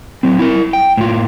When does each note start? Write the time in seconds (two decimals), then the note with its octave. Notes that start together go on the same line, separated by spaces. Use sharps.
0.23 F#3 C4
0.39 E4 A#4
0.73 G5
0.97 A2 F4